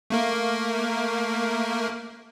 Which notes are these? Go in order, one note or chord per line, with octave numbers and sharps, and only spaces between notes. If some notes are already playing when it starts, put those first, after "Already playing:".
A3 A#3 A#4